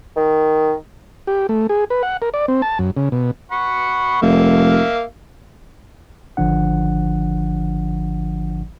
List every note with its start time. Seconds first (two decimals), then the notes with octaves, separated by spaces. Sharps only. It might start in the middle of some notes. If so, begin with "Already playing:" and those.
0.17 D#3
1.27 G4
1.49 A3
1.69 G#4
1.90 B4
2.03 F#5
2.22 A#4
2.34 D5
2.48 C4
2.62 A5
2.79 F#2
2.97 C#3
3.12 B2
3.52 F#5 B5 C#6
4.22 F1 A#3 E5 F5
6.37 G#1 D3 F3 D4 F#5